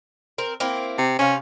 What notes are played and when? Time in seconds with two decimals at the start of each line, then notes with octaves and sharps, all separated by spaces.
0.38 C4 A#4
0.60 A#3 C4 E4
0.98 C3
1.19 C3 C#4 F5